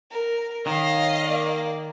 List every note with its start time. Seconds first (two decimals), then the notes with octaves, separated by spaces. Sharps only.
0.11 A#4
0.67 D#3 C#5 D#5 F5 C7
1.23 A#3 D5